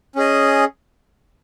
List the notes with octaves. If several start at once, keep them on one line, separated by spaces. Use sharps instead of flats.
C#4 G#4 D#5